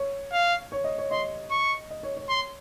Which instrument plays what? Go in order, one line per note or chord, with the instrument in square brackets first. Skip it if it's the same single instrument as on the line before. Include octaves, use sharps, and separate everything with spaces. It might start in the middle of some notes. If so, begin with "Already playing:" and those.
Already playing: [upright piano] C#5
[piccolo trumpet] F5
[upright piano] C#5
D#5
C#5
[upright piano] D#5 [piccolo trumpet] C6
[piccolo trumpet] C#6
[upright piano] D#5
C#5
C#5
[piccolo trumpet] C6